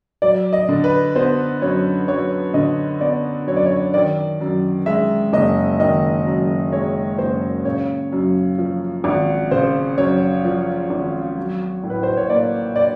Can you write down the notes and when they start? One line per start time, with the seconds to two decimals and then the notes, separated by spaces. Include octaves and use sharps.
0.22 F#3 D5
0.53 D#5
0.69 D3
0.84 B4
1.15 B3 C5
1.62 F#2 C#5
2.07 F#3 C#5
2.54 D3 D#5
3.01 B3 D5
3.47 F#2 C#5
3.56 D5
3.66 C#5
3.94 D#3 D5
4.41 F#2
4.86 G#3 E5
5.33 F#1 D#5
5.80 D#3 D#5
6.26 F#2
6.72 G#3 C#5
7.18 F#1 C5
7.65 C#3 C#5
8.12 F#2
8.58 F3
9.04 G#1
9.51 C#3 C5
9.98 F#2 C#5
10.45 F3
10.90 G#1
11.37 F#3
11.83 A2
11.90 B4
12.03 C5
12.17 C#5
12.30 A#3 D5
12.76 D5